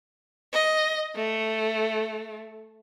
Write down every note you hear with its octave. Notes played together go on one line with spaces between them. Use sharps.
D#5
A3